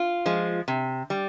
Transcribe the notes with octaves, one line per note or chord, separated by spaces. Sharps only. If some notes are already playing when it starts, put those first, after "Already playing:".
Already playing: F4
F3 G#3
C3
G3